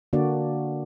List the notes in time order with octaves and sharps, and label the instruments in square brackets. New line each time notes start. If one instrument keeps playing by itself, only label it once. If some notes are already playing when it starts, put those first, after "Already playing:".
[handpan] D3 A#3 D4 F#4 D5